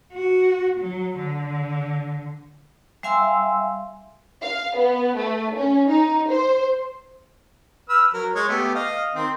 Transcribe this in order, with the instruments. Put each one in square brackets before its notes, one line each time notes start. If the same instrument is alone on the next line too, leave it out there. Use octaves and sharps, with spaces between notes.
[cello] F#4
F#3
D3
[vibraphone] G3 E5 F5 G#5 C6 E6
[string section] F5
B3
A3
C#4
D#4
C5
[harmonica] B4 E6 F6
F#3 A#4
G#3 C#5
A3 B3 G4
D#5 F5
D#3 C4 C6